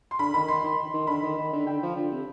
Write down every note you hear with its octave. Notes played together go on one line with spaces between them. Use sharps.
C6
D3 B5
D#3 B5
D#3 C6
D#3
D#3
D3 B5
D#3
D#3
D3
D3 G5
F3
D3
C3